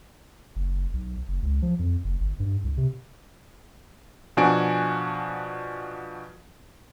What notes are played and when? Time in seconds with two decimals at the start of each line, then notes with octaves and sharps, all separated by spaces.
0.56 F#1
0.93 B1
1.28 F#1
1.42 C#2
1.62 F3
1.79 F2
2.05 F#1
2.20 G1
2.39 G2
2.64 C2
2.77 C3
4.37 B2 F3 D4 F#4 G#5 D7